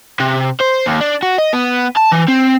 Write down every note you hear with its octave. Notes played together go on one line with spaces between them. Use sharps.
C3
C5
D#2
D4
F#4
D#5
B3
A5
E3
C4